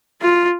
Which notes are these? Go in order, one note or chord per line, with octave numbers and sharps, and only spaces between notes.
F4